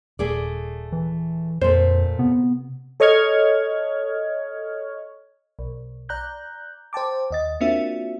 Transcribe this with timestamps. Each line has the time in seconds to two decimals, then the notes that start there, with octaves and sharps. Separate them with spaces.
0.19 D#1 A3 G#4 D5
0.92 E3
1.62 F2 A#2 A3 C5
2.19 C3 B3
3.00 A4 C#5 D#5 C#6 F6 G#6
5.59 B1
6.09 D5 A#5 F#6 G6
6.93 C5 G5 A5 D6
7.31 D#2 D#5 A6
7.61 A#3 C4 D4 F4 F#4 E5